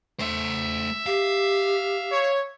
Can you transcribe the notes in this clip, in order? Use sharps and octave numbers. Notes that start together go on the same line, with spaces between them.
A3 C5 E5
G4 F5
C#5